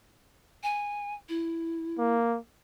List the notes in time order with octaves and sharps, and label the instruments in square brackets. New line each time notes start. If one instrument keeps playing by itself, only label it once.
[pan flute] G#5
E4
[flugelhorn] A#3